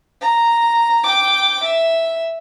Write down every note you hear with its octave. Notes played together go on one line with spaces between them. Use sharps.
A#5
G5 D6
E5